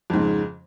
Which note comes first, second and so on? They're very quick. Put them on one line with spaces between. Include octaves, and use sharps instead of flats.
F2 G#2 C#3